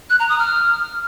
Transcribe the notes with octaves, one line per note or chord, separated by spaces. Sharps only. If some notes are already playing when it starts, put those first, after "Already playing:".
F#6
A#5
D#6
F6